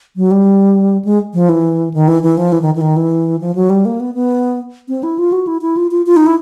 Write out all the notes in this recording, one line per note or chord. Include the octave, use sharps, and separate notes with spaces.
F#3
G3
G#3
F3
E3
D#3
E3
E3
F3
E3
D#3
E3
D#3
E3
F3
F#3
G3
A#3
B3
B3
C4
E4
F4
F#4
E4
E4
F4
F4
F4
D#4
E4